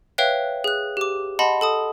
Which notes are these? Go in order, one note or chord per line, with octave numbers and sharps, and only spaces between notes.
B4 C#5 E5 F5 G5 F#6
G#4 F#6
G4 D6
D#5 F#5 A5 B5 C6
A4 A5 D#6